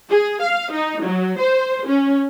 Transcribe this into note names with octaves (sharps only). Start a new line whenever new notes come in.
G#4
F5
D#4
F#3
C5
C#4